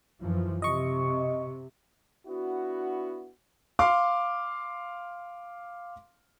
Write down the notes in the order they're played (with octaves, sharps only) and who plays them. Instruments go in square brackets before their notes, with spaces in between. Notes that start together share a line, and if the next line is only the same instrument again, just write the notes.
[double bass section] F#2 E3 F3
[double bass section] C3 [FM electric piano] D#5 C#6
[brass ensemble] B3 D4 E4 F#4
[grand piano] F5 C6 D6